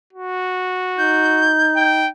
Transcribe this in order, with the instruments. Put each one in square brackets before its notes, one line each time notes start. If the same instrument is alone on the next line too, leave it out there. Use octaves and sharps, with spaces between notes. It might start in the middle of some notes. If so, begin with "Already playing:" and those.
[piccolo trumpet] F#4
[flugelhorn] D#4 [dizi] G6
[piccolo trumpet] G5